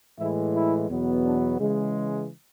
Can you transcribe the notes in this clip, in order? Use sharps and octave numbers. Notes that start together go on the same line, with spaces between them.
A2 E3 G#3 E4
E4
E2 B2 F#3 B3
D4
C#3 E3 G#3